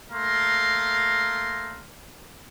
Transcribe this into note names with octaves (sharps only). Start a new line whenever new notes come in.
A3 A#3 F5 A#5 C6